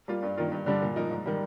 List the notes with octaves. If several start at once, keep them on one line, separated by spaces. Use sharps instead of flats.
G3 A#3 F4
G2
D#3 A#3 F4 A#4
G2
D3 G3 D4
A#2
F3 A#3 D#4 A#4
G#2
D#3 G3